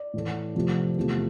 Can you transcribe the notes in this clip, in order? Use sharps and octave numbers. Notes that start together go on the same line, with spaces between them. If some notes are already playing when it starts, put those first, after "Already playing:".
Already playing: D5
A2 E3 A3
F2 C3 F3 A3
E2 C3 F3 A3